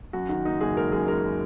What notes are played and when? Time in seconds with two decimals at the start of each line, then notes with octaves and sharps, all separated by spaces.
0.13 F#2 F#4
0.29 D#3 F#4
0.45 F#1 D#4
0.61 F#1 G#4
0.77 G#3 A#4
0.92 F#2 G#4
1.07 G#3 A#4